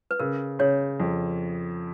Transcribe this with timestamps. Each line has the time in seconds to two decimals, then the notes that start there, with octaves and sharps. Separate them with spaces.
0.11 B4
0.20 C#3 A#4
0.59 C#3 C#5
1.00 F2